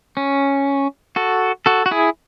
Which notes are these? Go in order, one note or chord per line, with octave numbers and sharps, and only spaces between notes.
C#4
F#4 A4
F#4 A4
F#4
E4 G#4